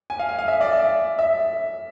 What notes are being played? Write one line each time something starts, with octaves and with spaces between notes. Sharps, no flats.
G#5
F5
G#5
F5
E5
D5
E5
E5